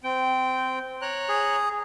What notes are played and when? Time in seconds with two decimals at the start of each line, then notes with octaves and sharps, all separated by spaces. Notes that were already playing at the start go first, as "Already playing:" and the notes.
0.04 C4 G5
1.02 C#5 A#5 F#6
1.29 G#4